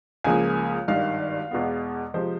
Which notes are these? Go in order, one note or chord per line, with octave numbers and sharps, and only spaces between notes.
C#2 C#3 F3 A#3 G#5
G#1 G2 D#3 F5
E2 B2 G#3 B3
C3 F3 G#3 C5